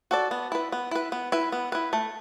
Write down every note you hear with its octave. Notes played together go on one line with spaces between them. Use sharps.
F#4 A4 D5
B3
E4 B4
B3
E4 B4
B3
E4 B4
B3
E4 B4
A3